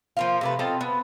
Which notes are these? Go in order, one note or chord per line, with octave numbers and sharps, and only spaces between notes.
F3 A#3 F4
C3 A3 B4
C4 F4 A4 D#5
B3